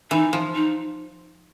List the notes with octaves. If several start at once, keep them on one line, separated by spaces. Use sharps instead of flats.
E3 D#4
F3
D#4